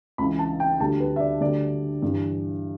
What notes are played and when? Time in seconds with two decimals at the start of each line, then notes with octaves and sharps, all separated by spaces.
0.18 C#2 C#3 E3 B5
0.39 A5
0.60 G5
0.80 D2 D3 G3 A5
1.00 B4
1.16 E5
1.20 D5
1.41 D2 D3 G3 D5
2.02 G2 E3 G3